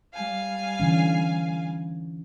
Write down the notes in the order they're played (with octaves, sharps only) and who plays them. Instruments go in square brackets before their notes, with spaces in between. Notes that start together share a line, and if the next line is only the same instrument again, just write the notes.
[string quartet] G3 F5 G#5
[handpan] D3 E3 C#4